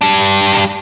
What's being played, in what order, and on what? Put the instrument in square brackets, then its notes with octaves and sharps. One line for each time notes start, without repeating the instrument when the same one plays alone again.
[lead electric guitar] G3 D4